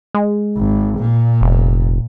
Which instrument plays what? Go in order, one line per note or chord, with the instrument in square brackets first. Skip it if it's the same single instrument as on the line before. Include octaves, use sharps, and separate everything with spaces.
[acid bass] G#3
[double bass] G#1
A#2
[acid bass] F1